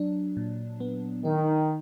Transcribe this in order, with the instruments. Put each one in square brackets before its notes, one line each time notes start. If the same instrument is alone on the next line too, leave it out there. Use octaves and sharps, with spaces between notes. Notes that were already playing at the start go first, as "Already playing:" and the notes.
Already playing: [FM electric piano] F#3 D4
A#2
B3
[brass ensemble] D#3 [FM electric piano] D#4